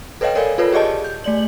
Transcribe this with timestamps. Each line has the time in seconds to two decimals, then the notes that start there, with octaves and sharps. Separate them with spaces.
0.21 A4 B4 C#5 D#5 F5 G5
0.35 A4 A#4 C#5 D5 F5 G#5
0.58 F4 A4 B4 C#5
0.73 G4 G#4 D5 D#5 A5
1.04 G6
1.24 A3 D5 F#7